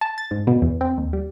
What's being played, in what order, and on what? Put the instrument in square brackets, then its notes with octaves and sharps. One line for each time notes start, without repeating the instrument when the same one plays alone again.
[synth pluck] A5
A6
G#2
B2
E2
C4
D#2
G3